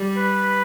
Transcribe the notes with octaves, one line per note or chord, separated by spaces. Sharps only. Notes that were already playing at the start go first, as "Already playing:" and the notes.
Already playing: G3
B4